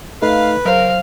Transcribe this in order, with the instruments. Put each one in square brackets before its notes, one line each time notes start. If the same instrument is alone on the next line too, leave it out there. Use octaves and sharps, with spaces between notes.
[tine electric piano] A3 D#4 A4 [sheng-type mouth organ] B4 [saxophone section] F5
[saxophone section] C#3 A#4 [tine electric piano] F#3 C5 [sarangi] F5